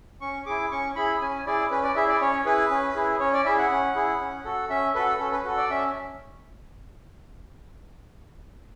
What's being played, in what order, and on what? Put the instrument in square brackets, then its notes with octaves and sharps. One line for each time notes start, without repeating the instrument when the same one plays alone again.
[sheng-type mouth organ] C#4 C#6
E4 G#4 D6
C#4 C#6
E4 G#4 B5
C#4 G#5
E4 G#4 D5
C#4 B4
D5
E4 G#4 E5
D5
C#4 C#5
E4 G#4 B4
C#4
E4 G#4
C#4 C#5
D5
E4 G#4 E5
F#5
C#4
E4 G#4
C#4
F#4 A4
C#4 E5
F#4 A4 B4
C#4 A4
B4
F#4 A4
D5
C#4 E5